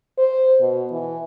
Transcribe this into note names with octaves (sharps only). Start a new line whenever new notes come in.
C5
B2
E3